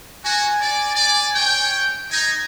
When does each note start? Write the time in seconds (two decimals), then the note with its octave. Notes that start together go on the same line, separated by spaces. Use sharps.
0.24 F#4 G#5
0.61 D5
0.96 D5
1.35 C#5 G5
2.11 D#4 G#6